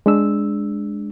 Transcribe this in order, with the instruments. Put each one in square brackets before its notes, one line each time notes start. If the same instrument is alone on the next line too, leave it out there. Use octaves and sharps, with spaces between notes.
[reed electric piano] G#3 D4 E6